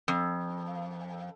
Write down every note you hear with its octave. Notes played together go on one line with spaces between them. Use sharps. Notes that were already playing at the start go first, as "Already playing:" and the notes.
F2